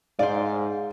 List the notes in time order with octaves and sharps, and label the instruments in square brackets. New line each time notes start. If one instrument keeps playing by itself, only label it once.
[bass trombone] G#2 [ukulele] C5 D5 [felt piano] F5